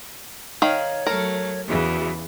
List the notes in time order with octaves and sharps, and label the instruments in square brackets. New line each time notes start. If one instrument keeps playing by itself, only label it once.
[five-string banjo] D#3 F5 [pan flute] C#5
[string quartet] F#3 A3 [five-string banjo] A#4
[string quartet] E2 C#3 E3 [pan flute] F#4